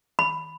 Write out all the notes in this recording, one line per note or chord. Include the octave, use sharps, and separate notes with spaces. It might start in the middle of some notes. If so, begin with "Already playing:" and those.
B5